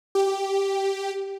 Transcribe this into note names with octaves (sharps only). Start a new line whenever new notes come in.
G4